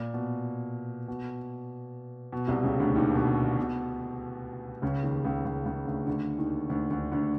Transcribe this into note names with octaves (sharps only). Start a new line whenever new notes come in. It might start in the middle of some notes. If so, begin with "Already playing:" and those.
Already playing: A#2
B2
B2
B2
C2 C3
C#2 C#3
D2 D3
D#2 D#3
B2
B2
C#2 C#3
D#2 D#3
C#2 C#3
C#2 C#3
C#2 C#3
D2 D3
D2 D3
D#2 D#3
D2 D3
D2 D3
D2 D3